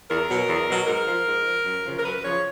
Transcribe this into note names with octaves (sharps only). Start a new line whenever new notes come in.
E2 A#4
B2 F#3
E2
B2 F#3
G#2 A#4
F3
G#2
F3
F#2
C#3 F3
A#4
F#2 B4
C#3 F3 C#5